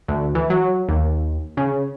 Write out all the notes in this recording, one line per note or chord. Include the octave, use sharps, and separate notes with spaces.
D2
E3
F#3
D#2
C#3